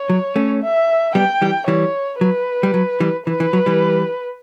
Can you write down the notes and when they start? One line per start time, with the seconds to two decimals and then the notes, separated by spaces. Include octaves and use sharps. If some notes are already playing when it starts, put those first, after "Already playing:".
Already playing: C#5
0.10 F#3
0.36 A3 C#4
0.62 E5
1.15 G3 B3 G5
1.42 E3 G3
1.68 E3 G3 C#5
2.21 F#3 B4
2.63 G3
2.74 F#3
3.00 E3 G3
3.27 E3 B4
3.40 E3
3.53 F#3
3.66 E3 G3